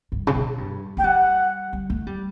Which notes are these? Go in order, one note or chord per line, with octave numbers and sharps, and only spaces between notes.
G2
C#3
B2
G2
A3 G5
G3 F#5
G3
A3
G3